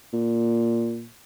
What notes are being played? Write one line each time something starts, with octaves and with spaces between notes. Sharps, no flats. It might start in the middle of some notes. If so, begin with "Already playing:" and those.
A#2